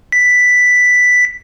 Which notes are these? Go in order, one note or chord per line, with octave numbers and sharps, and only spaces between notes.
B6